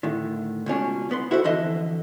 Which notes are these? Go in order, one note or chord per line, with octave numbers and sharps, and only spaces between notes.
A2 D3 D#3
C#2 B2 C#4 D4
C2 B3 B4 C6
E4 F#4 A4 B4 C5
F2 D3 E3 D4 D#5 E5